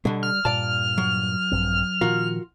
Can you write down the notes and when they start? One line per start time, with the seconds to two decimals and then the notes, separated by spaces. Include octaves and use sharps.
0.05 B2 D3 G3
0.23 F6
0.45 G2 A#2 D5 A5
0.98 F#3
1.51 A#1 G2 C4
2.01 A#2 D#3 F3 F4 F#4 A#4